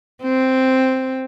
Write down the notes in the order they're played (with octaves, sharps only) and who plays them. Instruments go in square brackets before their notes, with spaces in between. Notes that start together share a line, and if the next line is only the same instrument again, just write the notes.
[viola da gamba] C4